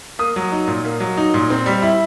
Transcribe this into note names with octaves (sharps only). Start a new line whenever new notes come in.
A#3 D#6
F#3
D#4
A#2
A#3
F#3
D#4
A#2
C4
G3
E4